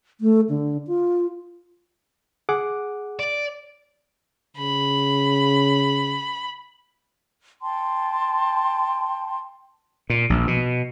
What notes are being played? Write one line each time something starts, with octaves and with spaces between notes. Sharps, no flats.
A3
D3
F4
G#4 F#5 D6
D5
C#3 B5
G5 A5 C6
A#2
A#1
B2